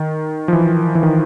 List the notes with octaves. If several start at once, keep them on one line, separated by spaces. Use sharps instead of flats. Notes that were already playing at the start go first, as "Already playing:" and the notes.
Already playing: D#3
F3
E3
E3
D#3